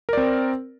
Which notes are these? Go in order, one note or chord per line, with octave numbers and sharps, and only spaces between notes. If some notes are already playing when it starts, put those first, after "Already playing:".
C4 A#4 D5